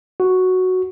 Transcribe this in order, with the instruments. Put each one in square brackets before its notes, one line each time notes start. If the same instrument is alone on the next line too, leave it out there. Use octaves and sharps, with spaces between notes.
[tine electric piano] F#4